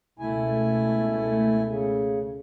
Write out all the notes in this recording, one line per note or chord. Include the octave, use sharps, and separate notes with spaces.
C#2 B2 A3 E4 G#5
C#3